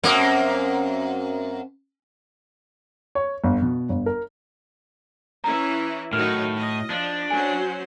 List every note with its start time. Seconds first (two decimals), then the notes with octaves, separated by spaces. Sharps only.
0.04 F#2 A#3 C4 C#4
3.15 C#5
3.44 G1
3.62 B2
3.89 G1
4.06 A#4
5.44 E3 C#4 E4 A#5
6.13 A2 D#3 F#3 D#4 F6
6.58 D#5
6.90 F3 D4
7.30 F#3 C#4 C5 G#5